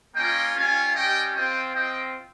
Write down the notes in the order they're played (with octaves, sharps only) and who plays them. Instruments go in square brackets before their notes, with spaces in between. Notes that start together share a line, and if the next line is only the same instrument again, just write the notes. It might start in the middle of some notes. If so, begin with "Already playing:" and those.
[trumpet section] A#3 C#4 F4 D#5 G5
G3 C#4 F4 F5 G#5
G3 C#4 G4 D#5 G5
C4 F4 D#5 G5
C4 F4 D#5 G5